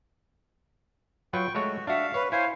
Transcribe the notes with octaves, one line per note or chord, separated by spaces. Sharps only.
F#3 F4 B4 G5 C#6
G#3 A3 F#4 C#5
D4 F#4 E5 F5
B4 C#5
E4 C5 C#5 F5 G#5